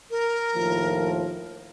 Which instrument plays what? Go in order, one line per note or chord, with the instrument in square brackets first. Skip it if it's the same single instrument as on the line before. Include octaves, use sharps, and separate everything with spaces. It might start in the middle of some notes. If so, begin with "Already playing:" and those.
[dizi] A#4
[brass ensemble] D#2 A2 F3